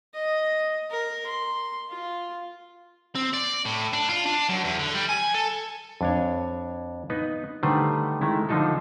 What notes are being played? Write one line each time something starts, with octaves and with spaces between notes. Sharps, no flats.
D#5
A#4
C6
F4
C4
D5
A2
D4
F4
D4
F#2
E2
D3
G3
G#5
A4
F2 D4 C#5
B3 D#4 B4
D3 D#3 G3 A3 B4 C5
D#3 G#3 A3 E4
D3 F3 D4 D#4 F4 A4